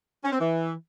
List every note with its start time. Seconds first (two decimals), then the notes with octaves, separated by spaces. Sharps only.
0.24 C#4
0.32 C4
0.39 E3